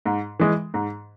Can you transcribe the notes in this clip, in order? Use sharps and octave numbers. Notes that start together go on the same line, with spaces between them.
G#2
E3 G#3
G#2